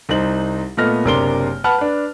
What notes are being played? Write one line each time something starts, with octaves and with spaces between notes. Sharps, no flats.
C2 D#4 C5 F#7
A#2 A3 B3 D#5 F6 A#6
F#1 C3 D4 A#4 C6 G7
B4 F#5 A5 B5 F6
D4 B4